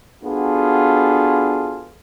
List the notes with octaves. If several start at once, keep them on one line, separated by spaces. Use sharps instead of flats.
B3 D4 F4 F#4 G#4 A4